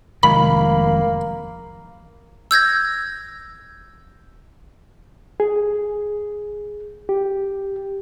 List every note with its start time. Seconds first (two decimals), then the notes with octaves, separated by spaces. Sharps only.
0.23 F1 D#3 G#3 A#3 B5
2.51 E6 G6 G#6 A#6
5.40 G#4
7.09 G4